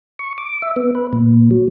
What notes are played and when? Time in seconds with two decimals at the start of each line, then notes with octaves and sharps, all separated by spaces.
0.19 C#6
0.38 D6
0.62 E5
0.76 B3
0.95 B4
1.13 A#2
1.51 F#3